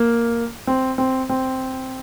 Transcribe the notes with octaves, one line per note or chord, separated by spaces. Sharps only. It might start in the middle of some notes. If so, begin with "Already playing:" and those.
Already playing: A#3
C4
C4
C4